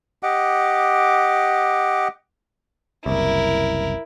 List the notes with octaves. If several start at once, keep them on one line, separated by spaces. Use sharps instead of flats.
G4 D#5 F#5 D6
F#1 C2 E4 A#4